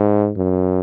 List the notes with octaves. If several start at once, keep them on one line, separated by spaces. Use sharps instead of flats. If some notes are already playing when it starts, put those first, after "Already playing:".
Already playing: G#2
F#2